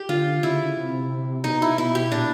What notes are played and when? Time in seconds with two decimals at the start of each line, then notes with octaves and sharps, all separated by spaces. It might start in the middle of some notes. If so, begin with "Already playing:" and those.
Already playing: G4
0.09 D3 F4
0.43 C#3 E4
0.77 C3
1.44 B2 D#4
1.62 E4
1.78 B2 E4
1.95 G4
2.12 A#2 D4